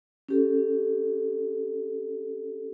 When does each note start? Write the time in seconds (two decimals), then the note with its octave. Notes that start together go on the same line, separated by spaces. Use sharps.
0.29 C#4 G4 A4